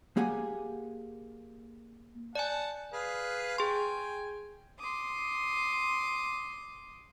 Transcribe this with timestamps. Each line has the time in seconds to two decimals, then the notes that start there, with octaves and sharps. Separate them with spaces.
0.17 A#3 G4 G#4 F#5 G#5
2.35 D5 F#5 G#5 A5
2.93 G#4 B4 F5
3.58 G#4 G5 G#5 C6
4.78 C6 D6 D#6